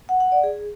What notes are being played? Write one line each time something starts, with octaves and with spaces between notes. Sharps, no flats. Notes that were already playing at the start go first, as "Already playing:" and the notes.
F#5
F#5
D5
G#4